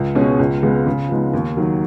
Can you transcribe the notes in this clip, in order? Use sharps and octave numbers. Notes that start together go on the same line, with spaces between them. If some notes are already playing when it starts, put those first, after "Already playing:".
Already playing: C#2
B2 G#3 C#4 G#4
C#2
C#3 G#3 B3
C#3
F3 G#3 B3 D#4
D#2
D#3 F#3